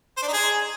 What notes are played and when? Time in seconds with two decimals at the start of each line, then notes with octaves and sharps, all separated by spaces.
0.17 C5
0.22 D4
0.28 D#4
0.33 G#4